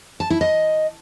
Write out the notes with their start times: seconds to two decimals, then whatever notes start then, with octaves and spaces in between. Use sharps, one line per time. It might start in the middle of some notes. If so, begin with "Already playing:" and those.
0.20 A5
0.30 E4
0.41 D#5